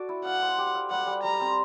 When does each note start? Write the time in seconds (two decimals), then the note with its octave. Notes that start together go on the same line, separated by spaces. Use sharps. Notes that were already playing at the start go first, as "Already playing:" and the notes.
Already playing: F#4 A4 D5
0.09 E4
0.25 F5 F#5
0.42 C5
0.58 G4
0.75 F5
0.91 G3 F#5
1.07 G3
1.23 G3 A#5
1.40 C4